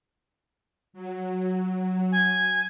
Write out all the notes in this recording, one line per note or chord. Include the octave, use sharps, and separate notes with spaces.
F#3
G#5